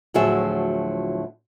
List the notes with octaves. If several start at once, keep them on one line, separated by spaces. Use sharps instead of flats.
D2 A2 F3 F#3 G#4 E5